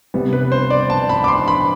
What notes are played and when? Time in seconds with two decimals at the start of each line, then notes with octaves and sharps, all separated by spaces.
0.14 C3 G3 B3
0.33 B4
0.52 C5
0.70 D5
0.90 A5
1.09 B5
1.24 D6
1.28 C6
1.48 B5